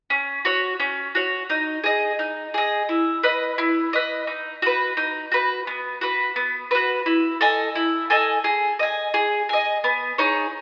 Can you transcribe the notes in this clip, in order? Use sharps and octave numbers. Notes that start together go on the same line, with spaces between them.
C#4
F#4 C#5
C#4
F#4 C#5
D#4
G#4 D#5
D#4
G#4 D#5
E4
B4 D#5
E4
B4 D#5
D#4
F#4 B4
D#4
F#4 B4
B3
F#4 B4
B3
F#4 B4
E4
A4 D#5 G#5
E4
A4 D#5 G#5
G#4
D#5 G#5
G#4
D#5 G#5
B3
D#4 G#4 C#5